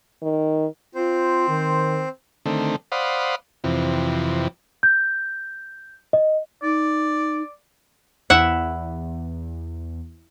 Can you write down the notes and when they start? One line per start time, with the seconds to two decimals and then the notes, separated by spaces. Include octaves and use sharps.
0.22 D#3
0.95 C4 F4 C5
1.49 D#3
2.46 D3 D#3 A3 C4
2.92 C5 D5 F5 F#5 B5 D#6
3.64 F2 C3 E3
4.83 G6
6.13 D#5
6.63 D#4 D5
8.30 E2 E4 E5 F#5